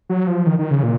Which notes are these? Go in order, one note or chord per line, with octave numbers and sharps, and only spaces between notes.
F#3
F3
D#3
D#3
C#3
A#2